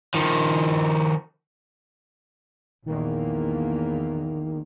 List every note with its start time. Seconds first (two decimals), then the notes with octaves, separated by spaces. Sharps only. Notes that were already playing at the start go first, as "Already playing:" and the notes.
0.14 D#3 F3
2.86 A#1 E2 D#3 A#3